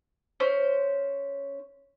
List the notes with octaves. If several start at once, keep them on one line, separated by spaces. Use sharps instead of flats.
C#4 C5